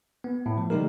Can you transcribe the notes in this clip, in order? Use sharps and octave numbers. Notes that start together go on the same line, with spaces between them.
B3
A2
F3
D3 G3 A3 D#4 G4 A#4